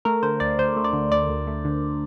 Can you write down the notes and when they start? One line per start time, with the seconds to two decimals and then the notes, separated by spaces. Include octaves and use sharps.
0.05 A3 A#4
0.23 D3 C5
0.40 D2 D5
0.58 D2 C5
0.76 A3
0.84 D5
0.93 D3
1.12 D2 D5
1.29 D2
1.47 A3
1.65 D3